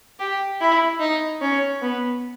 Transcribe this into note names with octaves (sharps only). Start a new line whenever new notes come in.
G4
E4
D#4
C#4
B3